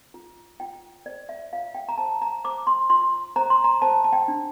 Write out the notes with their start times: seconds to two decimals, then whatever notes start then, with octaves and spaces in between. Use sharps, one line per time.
0.14 F4
0.60 F4 G5
1.06 C5 D5
1.29 E5
1.53 F4 F5
1.75 G5
1.89 A#5
1.98 C5 A5
2.22 A#5
2.44 C5 D6
2.67 C6
2.90 F4 C6
3.36 C5 A#5
3.50 C6
3.64 A#5
3.82 C5 A5
4.04 A5
4.13 G5
4.28 D4